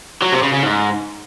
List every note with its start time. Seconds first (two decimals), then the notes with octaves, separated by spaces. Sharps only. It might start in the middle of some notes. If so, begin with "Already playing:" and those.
0.22 F#3
0.32 C3
0.43 C#3
0.53 C#3
0.63 G#2